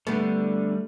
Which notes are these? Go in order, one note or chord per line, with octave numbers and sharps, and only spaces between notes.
D3 G3 A3 B3